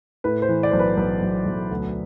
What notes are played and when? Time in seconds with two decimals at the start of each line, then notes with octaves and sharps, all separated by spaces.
0.24 A2 B4
0.42 C5
0.49 E3
0.63 D5
0.71 B1 C5
0.79 B4
0.97 B1 B4
1.22 B1
1.46 B1
1.71 D2